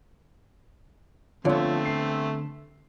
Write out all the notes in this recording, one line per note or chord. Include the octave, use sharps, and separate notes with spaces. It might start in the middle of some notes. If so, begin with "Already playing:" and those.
D3 F3 A3 B3 C4 C#5
C7